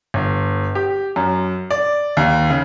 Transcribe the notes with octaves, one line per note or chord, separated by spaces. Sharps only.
G1
G4
F#2
D5
D#2
C#3